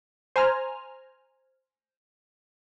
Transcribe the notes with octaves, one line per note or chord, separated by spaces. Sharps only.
C5 G#5 A#5 F6